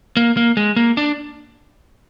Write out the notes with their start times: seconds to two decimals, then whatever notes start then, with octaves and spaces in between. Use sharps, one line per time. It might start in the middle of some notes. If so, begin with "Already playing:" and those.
0.17 A#3
0.37 A#3
0.57 G#3
0.76 A#3
0.97 D4